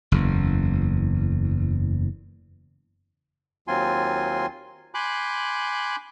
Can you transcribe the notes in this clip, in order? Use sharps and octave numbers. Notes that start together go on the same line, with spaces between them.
F#1 E2
D#2 F#3 C4 F4 G#5 C6
G#5 B5 C6 D6 F#6 G6